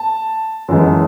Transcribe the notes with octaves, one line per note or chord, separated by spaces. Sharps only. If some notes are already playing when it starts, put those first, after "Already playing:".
Already playing: A5
F#2 E3 G#3